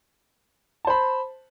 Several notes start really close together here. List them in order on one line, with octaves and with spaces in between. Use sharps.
A5 C5 B5